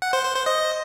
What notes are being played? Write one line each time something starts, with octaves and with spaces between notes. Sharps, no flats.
F#5
C5
C5
C5
D#5